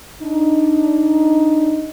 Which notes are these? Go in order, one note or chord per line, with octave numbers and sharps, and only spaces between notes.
D4 D#4